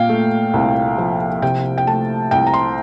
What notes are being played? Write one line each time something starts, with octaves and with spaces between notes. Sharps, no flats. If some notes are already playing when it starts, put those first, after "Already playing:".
Already playing: A#2 F5 G5
A3
C2
F3
C3 G5
G5
A3 A5
C2 G5
A#5
C6